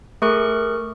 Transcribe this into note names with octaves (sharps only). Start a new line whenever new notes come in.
A3 G#4 A#4 C#6 F#6